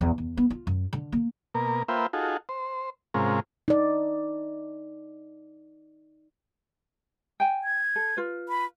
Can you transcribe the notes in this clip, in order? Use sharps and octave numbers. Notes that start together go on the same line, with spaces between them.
E2
E2
B3
F4
F#2
D3
A#3
B2 A#3 A#4
A#3 F4 B4 C5 E5 G5
D#4 F4 F#4 G#4 A4
C5
G#2 C3 G#3 C#4 F4 A#4
D#4 D5
G5 G#5
G#6
A4
F4 B4
B5